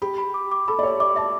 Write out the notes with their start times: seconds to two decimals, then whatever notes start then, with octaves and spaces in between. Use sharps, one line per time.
0.02 G4 B5
0.18 B5
0.34 D6
0.52 D6
0.68 A4 B5
0.79 D5
0.83 C#5 E5
1.00 D5 D6
1.16 E5 A5